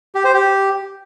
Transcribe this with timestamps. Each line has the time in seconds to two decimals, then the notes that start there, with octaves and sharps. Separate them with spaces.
0.15 G4
0.24 C5
0.34 G4